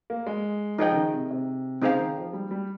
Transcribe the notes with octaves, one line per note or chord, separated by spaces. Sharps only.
A#3
G#3
F3 D#4 G#4 D#5 G5
C#3
D#3
C3
C3
C#3 C4 D#4 G#4 C5 F5
D#3
F3
G3
G3